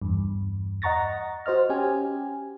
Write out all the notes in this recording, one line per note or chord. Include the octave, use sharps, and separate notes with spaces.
E2 G2
D#5 F#5 A#5 C#6 A6 A#6
F#4 C5 D#5 F6
C#4 G4 G#5